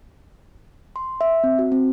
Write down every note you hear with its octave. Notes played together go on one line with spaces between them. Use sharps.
C6
E5
C4
F#4
C4